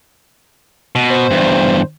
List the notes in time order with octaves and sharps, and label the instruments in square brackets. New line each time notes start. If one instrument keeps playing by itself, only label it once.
[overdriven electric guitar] B2
[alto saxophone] C5
[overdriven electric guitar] E2 G2